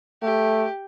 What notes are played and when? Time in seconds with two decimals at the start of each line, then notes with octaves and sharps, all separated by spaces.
0.22 A3 G4